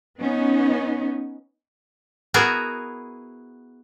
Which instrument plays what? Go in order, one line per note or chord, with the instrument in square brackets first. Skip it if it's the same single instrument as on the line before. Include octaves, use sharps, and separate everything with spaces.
[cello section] B3 C#4 D#4
[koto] B3 E4 F#4 G#4 A#4